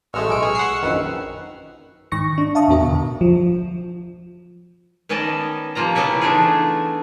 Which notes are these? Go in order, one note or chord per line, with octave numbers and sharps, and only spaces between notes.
A1 G#3 A3 C#6 E6 F6
B1 G#3 D7
G#4
F#5 C7
A#1 F#2 D#3 B4
G#2 D#3 C#6 A#6 C#7
D4
E5 F5 A5 C#6 D#6
E2 A2 B3 F#4 A#4
E2 B2 D3
F3
D#3 B3 C#4 D5 D#5 A5
C3 F3 A#3 F4 A#5
C#3 B3 C#4 E4 C#5
E3 A3 D4 D#4 F4 G#4